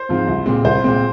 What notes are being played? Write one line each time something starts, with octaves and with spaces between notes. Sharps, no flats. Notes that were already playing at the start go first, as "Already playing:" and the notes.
Already playing: C5
G#2 F3 C4
C2
A#2 G#3 C4
C2 C5
A#2 G#3 C4